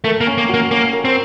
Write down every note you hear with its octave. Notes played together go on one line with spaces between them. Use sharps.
A3 A#4
A#3
C#4
A#3
F#4
A#3
A#3 C#4
A#4
C4